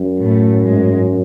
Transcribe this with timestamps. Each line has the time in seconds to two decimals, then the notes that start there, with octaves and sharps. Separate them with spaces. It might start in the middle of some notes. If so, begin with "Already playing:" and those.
Already playing: F#2
0.23 A2 A3
0.64 G#2 G#3